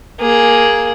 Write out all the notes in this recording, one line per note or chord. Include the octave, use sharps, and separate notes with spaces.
A#3 G#4